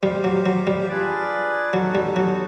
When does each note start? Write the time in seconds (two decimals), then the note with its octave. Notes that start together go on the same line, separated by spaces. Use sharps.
0.03 G3 G4 C5 F5
0.24 F#3
0.46 F#3
0.67 G3
0.89 D4 F4 G#4 B4 D5
1.73 F#3 B3 D#4 F#4 A4
1.95 G3
2.16 F#3